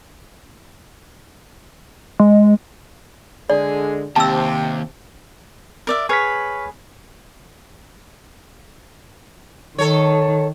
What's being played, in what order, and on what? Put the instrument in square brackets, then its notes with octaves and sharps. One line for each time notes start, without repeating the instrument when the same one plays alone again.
[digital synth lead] G#3
[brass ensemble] D3 G#3 [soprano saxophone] G#4 [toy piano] D5
[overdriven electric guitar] D#2 [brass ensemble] C3 [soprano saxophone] G5 [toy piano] A5 E6
[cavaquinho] A#4 D5 E5
[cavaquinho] G#4 B4 C#5 [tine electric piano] C#6 F6 B6
[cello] D#3 [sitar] A4 C#5